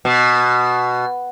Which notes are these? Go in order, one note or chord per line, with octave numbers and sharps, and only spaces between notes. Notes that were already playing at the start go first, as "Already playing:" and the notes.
B2